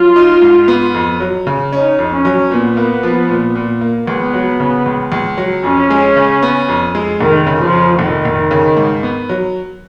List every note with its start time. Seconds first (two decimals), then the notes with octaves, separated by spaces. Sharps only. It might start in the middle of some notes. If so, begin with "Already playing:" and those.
Already playing: F#3 F4
0.16 D#4
0.42 G#2
0.68 B3
0.94 F2
1.20 F#3
1.47 C#3
1.72 C#4 D#4
1.99 F2
2.12 C#4
2.25 F#3
2.51 A#2 B3
2.77 A#3
3.03 F3
3.29 A#2
3.55 A#2
3.81 A#3
4.07 C#2 B3
4.34 F#3
4.60 C#3
4.86 C#2
5.12 C#2
5.38 F#3
5.64 F2 C#4
5.90 G#3
6.16 C#3
6.42 B3
6.68 F2
6.95 G#3
7.20 F1 D#3
7.47 C#3
7.60 F3
7.73 F2
7.98 F1 D#3
8.25 F1
8.51 C#3
8.77 G#2
9.03 B3
9.29 F#3